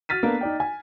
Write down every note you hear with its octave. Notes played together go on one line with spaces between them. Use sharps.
F#4 F6 A6 B6 D#7
A#3 B3 D4 A4
D#4 D5 G5
G#5